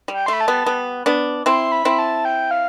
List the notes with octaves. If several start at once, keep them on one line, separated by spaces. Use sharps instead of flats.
G3
G5
A3 C6
B5
A5
G3 B3
G3 B3
B3 D4
C4 E4 C6
B5
C4 E4
A5
G5
F5